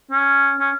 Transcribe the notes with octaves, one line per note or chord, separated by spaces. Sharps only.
C#4
C#4